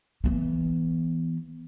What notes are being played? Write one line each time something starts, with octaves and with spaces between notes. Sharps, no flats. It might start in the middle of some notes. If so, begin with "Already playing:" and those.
E3 B3